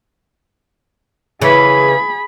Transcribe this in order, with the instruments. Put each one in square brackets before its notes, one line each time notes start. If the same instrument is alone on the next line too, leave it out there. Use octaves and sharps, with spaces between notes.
[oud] C#3 E3 [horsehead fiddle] G#4 B5